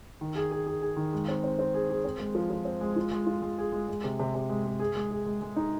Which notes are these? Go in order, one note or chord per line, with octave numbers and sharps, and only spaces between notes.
D#3
G#4
G#4
G#4
G#4
D#3
G#3
C4
C4
C4
G#4
G#4
C4
G#3
F3
F3
C4
G#3
F4
G#3
F4
G#3
G#4
G#3
G#3
C3
C3
C3
G#3
G#3
G#4
G#3
G#4
G#3
G#3
D#4